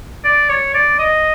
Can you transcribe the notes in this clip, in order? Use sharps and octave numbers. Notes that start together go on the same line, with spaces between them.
D5
C#5
D5
D#5